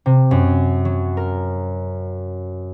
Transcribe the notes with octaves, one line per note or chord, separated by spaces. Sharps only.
C3
F#2
F#3
A#4